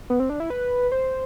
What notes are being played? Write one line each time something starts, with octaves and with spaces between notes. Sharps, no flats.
B3
C4
D4
E4
B4
C5